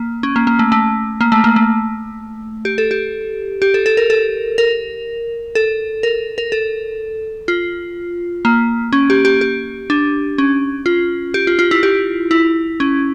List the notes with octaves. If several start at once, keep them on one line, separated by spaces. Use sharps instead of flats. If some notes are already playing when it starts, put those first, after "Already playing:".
Already playing: A#3
C#4
A#3
A#3
A3
A3
A#3
A3
A#3
A3
G4
A4
G4
G4
A4
A4
A#4
A4
A#4
A4
A#4
A#4
A4
F4
A#3
C#4
G4
G4
G4
D4
C#4
F4
G4
F4
F4
E4
G4
E4
C#4